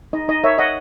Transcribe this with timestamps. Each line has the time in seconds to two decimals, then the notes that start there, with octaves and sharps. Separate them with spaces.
0.13 D#4 D#5
0.28 D#4 D#5
0.44 A#4 C#5 E5
0.58 C#5 D#5 F#5